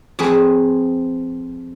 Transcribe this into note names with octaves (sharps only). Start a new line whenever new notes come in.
F2 C4 G#4 B4